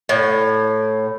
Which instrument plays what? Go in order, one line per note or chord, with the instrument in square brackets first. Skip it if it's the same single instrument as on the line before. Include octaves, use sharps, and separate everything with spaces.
[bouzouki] A2